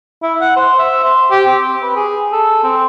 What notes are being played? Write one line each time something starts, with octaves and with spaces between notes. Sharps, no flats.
E4
F#5
C5
E5
C5
G4
C4
B4
G#4
A4
C4